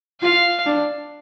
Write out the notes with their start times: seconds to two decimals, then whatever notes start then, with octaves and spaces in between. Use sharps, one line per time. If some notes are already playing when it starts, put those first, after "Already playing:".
0.21 F4 F5
0.66 D4